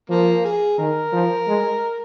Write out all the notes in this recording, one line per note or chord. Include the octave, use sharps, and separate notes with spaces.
F3 A#3
G#4
D#3 A#4
F3
G#3